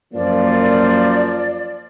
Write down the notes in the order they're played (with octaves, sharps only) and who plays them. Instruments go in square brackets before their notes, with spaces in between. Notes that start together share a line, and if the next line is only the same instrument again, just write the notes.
[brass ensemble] F#2 F3 A#3 [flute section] D5